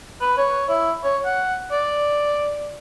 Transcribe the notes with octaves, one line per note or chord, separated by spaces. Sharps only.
B4
C#5
E4
C#5
F#5
D5